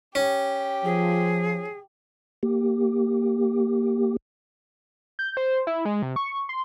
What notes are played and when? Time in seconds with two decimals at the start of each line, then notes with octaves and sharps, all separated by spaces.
0.15 C#4 G4
0.85 F3 G#4
2.43 A#3 G4
5.19 G6
5.37 C5
5.67 E4
5.85 G#3
6.02 C3
6.16 C#6
6.49 C6